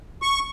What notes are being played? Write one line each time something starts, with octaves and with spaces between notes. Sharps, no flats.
C#6